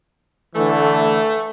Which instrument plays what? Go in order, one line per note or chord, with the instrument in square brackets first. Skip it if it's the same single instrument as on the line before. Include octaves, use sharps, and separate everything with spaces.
[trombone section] D3 E3 [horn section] A3